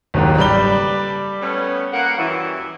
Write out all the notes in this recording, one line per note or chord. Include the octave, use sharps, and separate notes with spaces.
F#1 D#2 G#2
G3 A4 B4 D5 B5 G7
A3 B3 C#4
A#3 F#5
F#2 E3